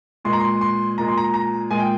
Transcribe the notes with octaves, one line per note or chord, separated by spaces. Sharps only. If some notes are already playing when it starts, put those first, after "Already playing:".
A#2 G#3 C6
A#5
C6
C6
A#2 G#3 A#5
C6
A#5
A#5
A#2 G#3 G#5
G5